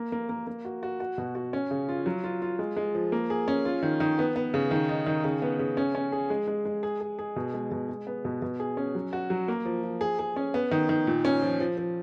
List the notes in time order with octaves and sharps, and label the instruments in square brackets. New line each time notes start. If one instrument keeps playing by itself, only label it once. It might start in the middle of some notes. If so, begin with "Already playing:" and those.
Already playing: [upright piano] A#3
A#3
A#3
A#3
F#4
F#4
F#4
B2
F#4
C#4
C#3
F4
F#3
F4
F4
G#3
G#3
F3
A#3
G#4
C#4
F4
D#3
D#3
B3
B3
C#3
D#3
D#4
D#3
C#3
B3
C#3
C#4
C#4
G#4
G#3
G#3
G#3
G#4
G#4
G#4
B2
G#3
B2
G#3
B3
B2
B2
G#4
C#4
F#3
F#4
F#3
A#3
F3
F3
G#4
G#4
C#4
B3
D#3
D#3
A#2
C#4
F3
F3
F3